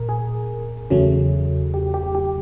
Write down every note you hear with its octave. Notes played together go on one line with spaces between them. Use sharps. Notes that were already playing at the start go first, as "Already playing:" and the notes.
Already playing: A#2 A#4
G#4
E2 C#3 F#3 A3
G4
G4
G4